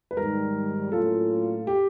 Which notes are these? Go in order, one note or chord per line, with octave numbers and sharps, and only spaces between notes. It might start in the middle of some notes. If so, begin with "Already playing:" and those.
B4
G#2 D#3 G3 A#4
A2 F#3 A#3 C#4 F4 A4
G4